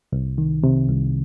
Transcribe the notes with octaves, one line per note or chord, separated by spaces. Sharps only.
C2
D#3
C3
C2